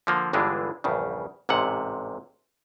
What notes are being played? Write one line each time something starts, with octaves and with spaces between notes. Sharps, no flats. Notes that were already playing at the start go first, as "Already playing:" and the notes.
D3 F3 A#3
G1 G2 D3 E3 G#3 D4
A#1 E2 G2 C#3
A1 G#2 C3 F#5